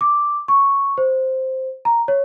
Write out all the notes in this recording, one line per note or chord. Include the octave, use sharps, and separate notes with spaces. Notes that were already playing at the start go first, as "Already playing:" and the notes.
D6
C#6
C5
A#5
C#5